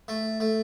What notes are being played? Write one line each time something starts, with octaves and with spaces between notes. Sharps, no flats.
A3
A3